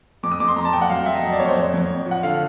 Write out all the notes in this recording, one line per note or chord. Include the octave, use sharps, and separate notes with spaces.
F2 D6
D#6
F2 D6
C6
F2 A#5
A5
F2 G5
F#5
F#3 F5
F#3 E5
D#5
F2
D5
F2 C#5
C5
F2 C#5
F2
F2
F3
F#5
D3 F5